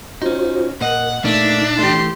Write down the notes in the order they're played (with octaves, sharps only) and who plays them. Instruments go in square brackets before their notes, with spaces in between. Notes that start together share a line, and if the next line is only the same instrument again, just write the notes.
[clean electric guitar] C#4 D#4 [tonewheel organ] F4 F#4 C5
[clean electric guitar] A#2 D#5 [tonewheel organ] A#4 [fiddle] F#5
[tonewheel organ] A#2 D#4 [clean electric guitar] A3 A#3 [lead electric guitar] D4 [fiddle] E5
[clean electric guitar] E3 A3 [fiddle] G4 C6